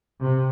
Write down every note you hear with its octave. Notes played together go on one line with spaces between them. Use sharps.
C3